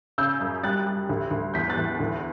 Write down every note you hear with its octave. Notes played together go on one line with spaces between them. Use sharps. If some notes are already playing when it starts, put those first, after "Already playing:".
C#3 E6 G6
F#2
G3 F#6 A6
G3
D2
D2
E2 G6 B6
F#6 A6
E2
D2